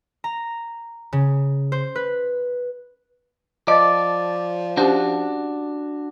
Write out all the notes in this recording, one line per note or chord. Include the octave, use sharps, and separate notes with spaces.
A#5
C#3
C5
B4
F3 D5 D#5 A5 D6 A6
C#4 D4 F#4 G4 C5 A5